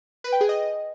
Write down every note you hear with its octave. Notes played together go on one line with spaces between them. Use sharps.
B4
G5
G#4
D#5